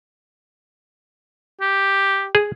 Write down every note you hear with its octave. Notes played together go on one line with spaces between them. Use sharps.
G4
G#4